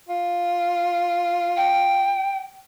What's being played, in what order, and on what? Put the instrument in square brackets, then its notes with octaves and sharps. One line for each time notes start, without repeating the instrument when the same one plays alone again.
[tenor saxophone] F4
[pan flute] G5